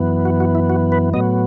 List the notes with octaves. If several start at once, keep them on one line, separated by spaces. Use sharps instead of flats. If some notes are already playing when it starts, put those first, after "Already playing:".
Already playing: F#2 E3 B3
F#4
F#4
E4
F#4
B4
A2 F#3 B3 D#5